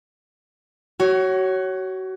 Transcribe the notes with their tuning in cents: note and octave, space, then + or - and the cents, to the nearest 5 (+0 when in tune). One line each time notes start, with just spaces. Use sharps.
F#4 +30 C#5 +0